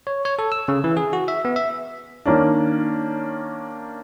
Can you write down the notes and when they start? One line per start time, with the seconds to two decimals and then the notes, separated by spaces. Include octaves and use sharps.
0.07 C#5
0.25 C#5
0.39 A4
0.52 E6
0.68 C#3
0.84 E3
0.97 G#4
1.13 F#4
1.28 E5
1.45 B3
1.56 E5
2.25 D#3 A#3 C#4 D4